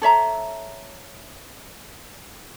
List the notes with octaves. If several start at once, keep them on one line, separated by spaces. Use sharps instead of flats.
A4 C#5 E5 A#5